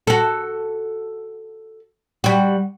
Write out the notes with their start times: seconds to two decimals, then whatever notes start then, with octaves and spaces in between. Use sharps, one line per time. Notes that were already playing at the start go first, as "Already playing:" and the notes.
0.07 F#4 A4
2.24 G3 F#4